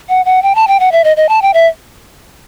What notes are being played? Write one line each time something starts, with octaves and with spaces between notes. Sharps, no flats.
F#5
F#5
G5
A5
G5
F#5
E5
D#5
D#5
A5
G5
E5